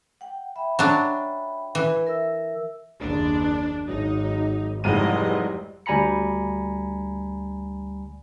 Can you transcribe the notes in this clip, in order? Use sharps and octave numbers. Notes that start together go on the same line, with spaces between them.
F#5 G5
E5 G5 B5
F#3 D4
E3 B4
A#4 E5 E6
F#1 D#2 D4
G#1 F#3 D#4
F1 G#2 E3 F#3 G3 D#5 D#7
D2 G3 G#5 A#5 B5 C#7